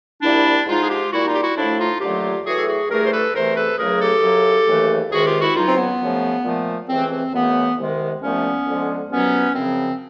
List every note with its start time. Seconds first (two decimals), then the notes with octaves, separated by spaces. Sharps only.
0.23 C2 A#2 G3 D4 E4
0.66 G#2 F3 G#3 D#4 F4
0.83 G#4
0.89 F4 G4
1.12 A#2 G3 E4 F#4
1.26 D#4 F4
1.35 G4
1.41 E4 F#4
1.56 A2 F3 A3 D4 E4
1.78 D#4 F4
2.00 D#2 D3 F#3 A3 F4 G4
2.44 A2 E3 A3 F#4 G#4
2.56 A4
2.66 F#4 G#4
2.89 G2 E3 A3 G#4 A#4
3.06 C5
3.11 A4 B4
3.33 E2 C3 E3 A3 A#4 C5
3.55 A4 B4
3.77 C#2 C#3 F#3 A3 G#4 A#4
4.00 G4 A4
4.21 F#2 C#3 F#3
4.66 D#2 C#3 E3 A3
5.10 C#2 C3 D#3 G#3 F#4 G#4
5.25 F4 G4
5.41 E4 F#4
5.55 C#2 C#3 F#3 D#4 F4
5.68 C4
5.77 B3
5.99 F#2 C#3 F3 A3
6.44 A#2 F3 A3
6.88 C#2 C3 E3 A3 C4
7.10 C4
7.33 F#2 C#3 E3 A3 B3
7.77 C2 C3 D#3 G#3
8.21 C2 A#2 F3 A3 B3 C#4
8.66 F2 D3 F3 G#3
9.10 C2 B2 F#3 B3 C#4
9.55 F#2 C#3 F3 C4